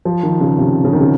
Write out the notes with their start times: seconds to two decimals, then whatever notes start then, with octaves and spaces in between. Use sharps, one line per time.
0.05 F3
0.23 D#3
0.41 C#3
0.58 C3
0.85 C#3
0.93 D#3
1.00 C#3